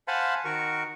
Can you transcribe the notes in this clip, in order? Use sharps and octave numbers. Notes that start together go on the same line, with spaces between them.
C5 F5 F#5 G#5 A5 B5
D#3 F#4 A#4 C#6